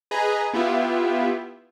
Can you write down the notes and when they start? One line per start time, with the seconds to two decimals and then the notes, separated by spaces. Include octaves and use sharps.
0.11 G#4 B4 D#5 G#5 A#5
0.54 B3 E4 F4 G4 E5